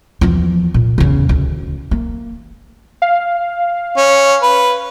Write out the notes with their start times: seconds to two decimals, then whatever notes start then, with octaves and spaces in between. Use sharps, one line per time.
0.21 E2 F3
0.74 A#2
0.98 E2 C#3
1.29 D2
1.91 A#3
3.02 F5
3.97 C#4
4.42 B4